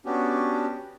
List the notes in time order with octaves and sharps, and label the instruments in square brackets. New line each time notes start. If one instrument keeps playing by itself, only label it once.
[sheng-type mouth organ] B3 C#4 D4 F#4 G4